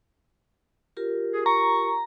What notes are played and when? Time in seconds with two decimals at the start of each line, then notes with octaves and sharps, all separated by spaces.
0.97 F4 G4 A#4
1.32 G#4
1.46 A#5 C#6